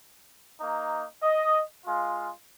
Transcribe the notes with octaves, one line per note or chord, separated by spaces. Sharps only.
A#3 D#4
D#5
G#3 F4